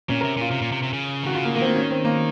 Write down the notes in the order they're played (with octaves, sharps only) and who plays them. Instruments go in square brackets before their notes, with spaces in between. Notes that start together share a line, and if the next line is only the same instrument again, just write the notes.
[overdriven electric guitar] A#2 [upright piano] C#4
[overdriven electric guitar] C3 [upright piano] A#4
[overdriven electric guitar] A#2 [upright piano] F4
[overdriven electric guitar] C3
A#2
C3
C3
C#3
[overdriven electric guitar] D#3 [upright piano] F#4
[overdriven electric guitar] C#3 [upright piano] F4
[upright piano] A#3
[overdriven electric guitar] D#3 [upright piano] A#3
[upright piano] C4
A#3
C#4
C4
A#3